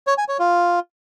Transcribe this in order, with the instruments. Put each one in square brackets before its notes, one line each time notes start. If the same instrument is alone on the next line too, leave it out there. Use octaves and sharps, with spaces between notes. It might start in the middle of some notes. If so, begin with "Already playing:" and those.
[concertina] C#5
G#5
C#5
F4